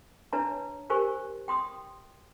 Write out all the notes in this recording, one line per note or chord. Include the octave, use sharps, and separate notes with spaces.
D4 B4 C#5 E5 A5 A#5
G4 A#4 C5 G#5 C#6
G5 C6 D#6